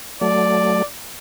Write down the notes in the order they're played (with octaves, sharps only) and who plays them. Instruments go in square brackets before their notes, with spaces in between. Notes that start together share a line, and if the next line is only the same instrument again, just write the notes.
[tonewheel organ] F#3 A3 [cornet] D5